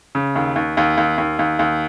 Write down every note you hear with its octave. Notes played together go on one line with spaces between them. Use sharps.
C#3
D#2
D#2
D#2
D#2
D#2
D#2
D#2